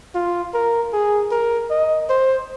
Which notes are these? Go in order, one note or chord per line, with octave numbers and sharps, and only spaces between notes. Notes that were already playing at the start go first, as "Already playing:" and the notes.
F4
A#4
G#4
A#4
D#5
C5